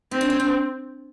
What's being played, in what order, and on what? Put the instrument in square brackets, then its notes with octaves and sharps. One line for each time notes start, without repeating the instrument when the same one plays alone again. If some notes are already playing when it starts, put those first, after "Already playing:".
[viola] C4 [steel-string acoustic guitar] D#4
[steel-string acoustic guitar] D4
C#4
D4